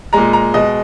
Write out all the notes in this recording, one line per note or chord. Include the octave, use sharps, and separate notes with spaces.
A#2 G#3 A#5
A#5
B2 G#3 D#5